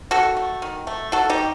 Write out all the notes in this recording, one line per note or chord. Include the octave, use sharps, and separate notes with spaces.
D#3 F#4 A4
A3
D#3
A3
D#3 F#4 A4
D#4 G4
G3